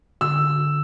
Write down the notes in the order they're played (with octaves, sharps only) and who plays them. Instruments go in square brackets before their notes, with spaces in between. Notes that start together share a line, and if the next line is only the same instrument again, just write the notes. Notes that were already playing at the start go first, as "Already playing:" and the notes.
[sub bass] D3 [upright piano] E6